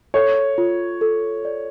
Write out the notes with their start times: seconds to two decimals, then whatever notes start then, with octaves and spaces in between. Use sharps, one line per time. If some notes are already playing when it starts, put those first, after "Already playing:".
0.14 A4 C#5
0.58 F4
1.01 A4
1.45 D5